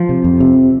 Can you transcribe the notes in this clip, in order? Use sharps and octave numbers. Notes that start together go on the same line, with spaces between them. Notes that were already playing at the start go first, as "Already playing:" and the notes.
Already playing: F3
C3
F2
C3